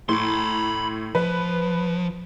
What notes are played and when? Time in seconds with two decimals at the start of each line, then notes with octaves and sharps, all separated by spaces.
0.09 A2 B5 C6
1.15 F3 B4